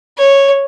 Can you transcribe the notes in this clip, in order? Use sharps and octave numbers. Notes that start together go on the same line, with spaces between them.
C#5